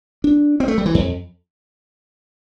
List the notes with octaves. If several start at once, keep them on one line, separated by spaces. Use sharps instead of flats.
D4
C4
A3
G3
E3
F2